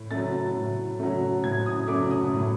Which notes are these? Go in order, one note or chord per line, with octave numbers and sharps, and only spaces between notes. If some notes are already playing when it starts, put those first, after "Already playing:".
Already playing: A2
F#3 A3 A6
A2
F#3 A3
A2 G#6
D#6
F#3 A3 D6
D#6
A2